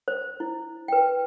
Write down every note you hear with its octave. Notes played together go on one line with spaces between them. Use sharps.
C5
E4
B4 G5